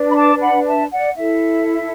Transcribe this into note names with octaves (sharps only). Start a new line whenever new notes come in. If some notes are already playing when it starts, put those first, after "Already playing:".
Already playing: D4 B4
B5
A5 D6
F#5 B5
E5 A5
D5 F#5
E4 A4 E5